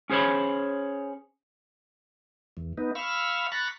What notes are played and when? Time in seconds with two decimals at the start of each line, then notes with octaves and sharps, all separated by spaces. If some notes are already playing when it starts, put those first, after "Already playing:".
0.10 C#4 G#4 C5 C#5 B5
2.57 E2
2.78 B3 D#4
2.95 F5 B5 C#6 E6 F6
3.52 A#5 B5 C#6 F#6 A6